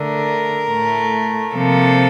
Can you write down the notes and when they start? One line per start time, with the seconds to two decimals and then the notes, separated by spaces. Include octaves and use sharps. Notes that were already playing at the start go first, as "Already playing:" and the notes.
Already playing: D3 A3 A#4
0.69 A2 A3
1.56 C3 F3 A#3 A4